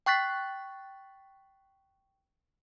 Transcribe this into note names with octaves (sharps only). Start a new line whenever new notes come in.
G5 C#6 F#6 A6 B6